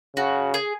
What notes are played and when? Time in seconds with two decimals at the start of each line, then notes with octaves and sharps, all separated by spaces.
0.16 C#3 F#4
0.54 G#4